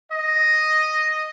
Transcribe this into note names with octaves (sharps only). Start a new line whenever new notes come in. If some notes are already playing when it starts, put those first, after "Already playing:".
D#5